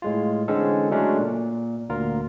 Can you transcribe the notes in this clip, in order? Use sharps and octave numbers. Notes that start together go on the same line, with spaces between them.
A2 G#3 F4
D3 E3 G#3 C4 C#4 A4
C#3 F#3 G#3 A3 C#4 D4
A#2
D2 A#2 F4 A#4